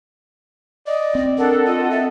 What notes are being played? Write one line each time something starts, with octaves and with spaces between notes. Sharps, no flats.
D5 D#5
C4
D4 A4 A#4 F#5
F4 D#5
E5